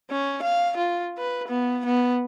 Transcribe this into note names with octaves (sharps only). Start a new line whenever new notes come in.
C#4
F5
F4
B4
B3
B3